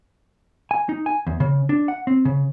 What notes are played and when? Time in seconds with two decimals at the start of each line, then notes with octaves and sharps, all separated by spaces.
0.71 G#5
0.89 D#4
1.06 G#5
1.27 E2
1.40 C#3
1.69 D4
1.88 F#5
2.07 C4
2.25 C#3